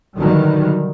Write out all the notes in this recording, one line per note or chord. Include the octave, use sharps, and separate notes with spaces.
B2 D3 D#3 F#3 G3